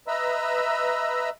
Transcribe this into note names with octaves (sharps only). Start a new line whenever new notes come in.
B4 D#5 E5 A#5 B5 E6